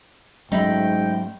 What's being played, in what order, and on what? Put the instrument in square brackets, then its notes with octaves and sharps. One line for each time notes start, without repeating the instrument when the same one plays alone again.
[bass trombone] G#2 [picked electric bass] F#3 A3 C#4 [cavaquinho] D#4 E5 B5 [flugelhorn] G5